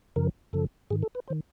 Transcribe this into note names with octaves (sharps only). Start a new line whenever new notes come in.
F#2 C#3 F3 A#4
F#2 C#3 F3 A4
G#2 D#3 G#4
A4
B4
C5
D#3